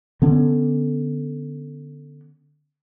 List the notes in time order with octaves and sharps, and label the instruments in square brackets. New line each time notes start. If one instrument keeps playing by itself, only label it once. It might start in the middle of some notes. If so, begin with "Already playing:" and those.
[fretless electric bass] D3 B3 C#4